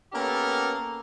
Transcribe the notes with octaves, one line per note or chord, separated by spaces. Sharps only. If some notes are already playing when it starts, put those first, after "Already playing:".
A#3 B3 C#4 G4 A4 A#4